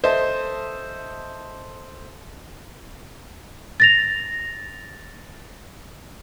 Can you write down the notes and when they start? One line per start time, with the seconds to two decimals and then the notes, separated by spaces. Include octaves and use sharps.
0.04 A4 C5 D#5 E5 A5
3.80 A6 A#6 F7